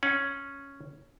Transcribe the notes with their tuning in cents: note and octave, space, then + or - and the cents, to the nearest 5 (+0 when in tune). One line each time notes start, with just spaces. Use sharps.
C#4 +0 F#5 -25